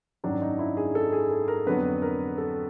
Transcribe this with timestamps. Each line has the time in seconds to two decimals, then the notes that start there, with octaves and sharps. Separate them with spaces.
0.24 G#1 F#2 D#3 F#3 D4
0.42 D#4
0.59 E4
0.77 G#4
0.95 A4
1.12 G#4
1.31 A4
1.48 A#4
1.66 F2 D3 F#3 B3 B4
2.02 A#4
2.38 A4